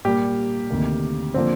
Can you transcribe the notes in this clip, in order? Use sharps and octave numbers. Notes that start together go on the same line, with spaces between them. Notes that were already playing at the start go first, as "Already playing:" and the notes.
A#2 G3 A#3 G4
D2 C3 D#3 A#3
D3 F3 A#3 C4